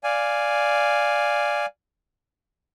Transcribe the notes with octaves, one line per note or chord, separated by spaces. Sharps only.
D5 F5 G#5